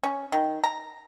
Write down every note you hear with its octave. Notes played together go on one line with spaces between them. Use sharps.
C#4
D#3
A#5